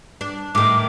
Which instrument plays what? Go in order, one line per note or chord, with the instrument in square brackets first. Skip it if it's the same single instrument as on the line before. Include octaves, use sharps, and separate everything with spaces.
[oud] D4
[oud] A2 D#3 [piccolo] D6